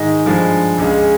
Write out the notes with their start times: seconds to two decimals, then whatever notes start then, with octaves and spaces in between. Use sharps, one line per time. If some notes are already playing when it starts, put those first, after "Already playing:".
Already playing: G#2 D#3 G#3 D#5
0.26 G2 F3 G#3
0.78 C#2 C#3 G#3